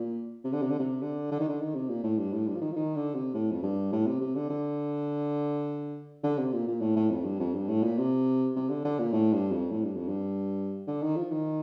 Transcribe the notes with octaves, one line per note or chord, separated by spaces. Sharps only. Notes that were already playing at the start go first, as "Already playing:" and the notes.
Already playing: A#2
C3
D3
C3
D3
C3
D3
D3
D#3
D3
D#3
C3
A#2
A2
G2
A2
G2
F3
D#3
F3
D#3
D3
C3
A2
F2
G2
A2
C3
C3
D3
D3
D3
C3
A#2
A#2
A2
A2
F2
G2
F2
G2
A2
A#2
C3
C3
D3
D3
A#2
A2
G2
F2
A2
G2
F2
G2
D3
D#3
F3
D#3